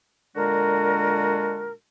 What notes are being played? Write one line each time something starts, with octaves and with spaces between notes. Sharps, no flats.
A#2 D3 G#3 D4 F#4 A#4